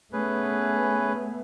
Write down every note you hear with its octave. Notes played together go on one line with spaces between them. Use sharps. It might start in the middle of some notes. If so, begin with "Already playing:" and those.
A3 B3 C#4 G#4 B4